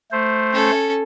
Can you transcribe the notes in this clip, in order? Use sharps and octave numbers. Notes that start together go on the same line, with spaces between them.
A3 C5
C#4 A4